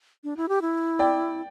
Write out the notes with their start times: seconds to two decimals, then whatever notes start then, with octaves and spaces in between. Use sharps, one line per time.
0.24 D4
0.37 E4
0.49 G4
0.62 E4
0.99 D5 G5